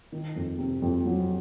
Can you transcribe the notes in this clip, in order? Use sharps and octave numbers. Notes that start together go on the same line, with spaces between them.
D#3
F2
C3
F2
F#3